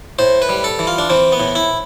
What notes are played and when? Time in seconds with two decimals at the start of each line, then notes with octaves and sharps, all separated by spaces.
0.19 A2 C5
0.42 B4
0.49 G3
0.64 A4
0.79 E3
0.87 F4
0.98 D4
1.10 E3 C4
1.32 B3
1.40 A2
1.55 E4